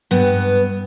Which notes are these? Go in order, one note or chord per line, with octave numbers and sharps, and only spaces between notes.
G2 B3